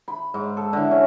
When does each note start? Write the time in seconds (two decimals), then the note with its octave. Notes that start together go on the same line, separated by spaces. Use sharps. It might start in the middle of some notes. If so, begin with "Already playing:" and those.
0.08 B5
0.34 G#2
0.57 A4
0.73 D3 E3
0.91 C#4